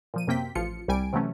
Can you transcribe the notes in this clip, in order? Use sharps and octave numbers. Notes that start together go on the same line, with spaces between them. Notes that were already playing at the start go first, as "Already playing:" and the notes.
A#2 F3 D#7
F#2 C3 A#3 C4 G5 B6
A1 F3 F4 C#7
C2 G3 G#5 D7
C3 E3 F#3 A3 C#4